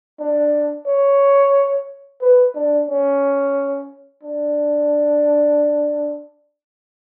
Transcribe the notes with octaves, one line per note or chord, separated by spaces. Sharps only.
D4
C#5
B4
D4
C#4
D4